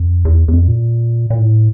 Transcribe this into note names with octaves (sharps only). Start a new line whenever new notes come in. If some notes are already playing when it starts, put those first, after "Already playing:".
Already playing: F2
E2
E2
F2
A#2
A#2
A2